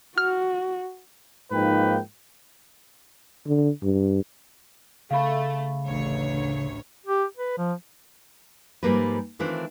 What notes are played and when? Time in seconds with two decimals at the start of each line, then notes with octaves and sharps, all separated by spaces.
0.18 F#4 F6
1.52 G#2 F3 A#3 D#4 B4 G5
3.47 D3
3.83 G2
5.11 C#3 A3 F5 B5
5.86 A1 D2 C#5
7.06 G4
7.37 B4
7.58 F3
8.83 G#2 F3 G3 A#3 A#4 B4
9.39 D#3 E3 A3 C4 D4 F4